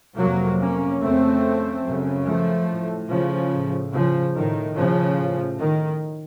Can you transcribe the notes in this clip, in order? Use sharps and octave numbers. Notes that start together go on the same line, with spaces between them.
F2 C3 F#3 A#3
A#3 C#4
F2 C#3 A3 C4
F#2 C#3
F3 A3
A2
C#3 F3
A2
C#3 F3
A2 D#3
C#3 F3
A2
D#3